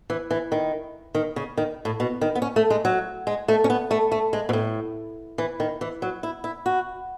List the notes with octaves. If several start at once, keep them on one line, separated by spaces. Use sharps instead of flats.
E3
E3
D#3
D#3
C#3
D#3
A2
B2
D#3
B3
C#4
A3
G#3
F#3
G#3
A3
C#4
B3
A3
A3
G#3
B2
A2
E3
D#3
E3
F#3
E4
E4
F#4